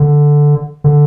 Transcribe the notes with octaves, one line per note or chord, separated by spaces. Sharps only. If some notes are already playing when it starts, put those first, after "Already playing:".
Already playing: D3
D3